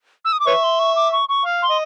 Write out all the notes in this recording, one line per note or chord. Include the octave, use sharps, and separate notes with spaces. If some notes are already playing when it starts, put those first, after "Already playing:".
E6
D#6
D6
B4 C#5 E5 C#6
C6
C#6
D6
C#6
C#6
F5
C6
D#5